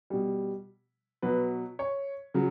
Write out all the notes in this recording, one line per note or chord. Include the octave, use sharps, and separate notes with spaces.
B2 G3
B2 F#3 B4
C#5
C#3 F#3